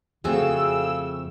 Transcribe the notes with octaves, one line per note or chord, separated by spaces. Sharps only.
F2 C#3 A3 C4 F#4 G#4 A4 E6